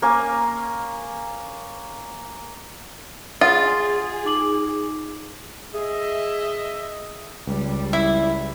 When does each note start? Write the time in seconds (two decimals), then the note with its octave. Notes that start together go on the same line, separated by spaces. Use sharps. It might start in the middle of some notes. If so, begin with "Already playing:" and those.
0.02 A#3 C#4 G#5
3.41 F4 G#4 F#5 D#6 A6
4.25 D#4 D6 F#7
5.74 G#4 D#5 E5
7.47 C#2 G3
7.93 E4 E5